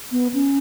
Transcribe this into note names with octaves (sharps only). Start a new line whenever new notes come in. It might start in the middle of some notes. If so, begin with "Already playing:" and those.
B3
C#4